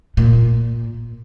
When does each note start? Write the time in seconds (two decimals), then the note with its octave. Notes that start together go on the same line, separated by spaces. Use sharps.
0.17 A#2